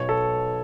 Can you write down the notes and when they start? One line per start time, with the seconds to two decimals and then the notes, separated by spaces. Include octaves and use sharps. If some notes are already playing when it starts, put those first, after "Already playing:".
Already playing: B1 B2 C#5
0.09 A4